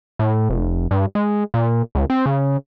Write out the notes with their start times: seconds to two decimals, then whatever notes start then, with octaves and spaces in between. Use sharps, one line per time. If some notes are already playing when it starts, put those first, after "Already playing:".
0.19 A2
0.50 F1
0.91 G2
1.15 G#3
1.54 A#2
1.95 C#2
2.10 C4
2.26 C#3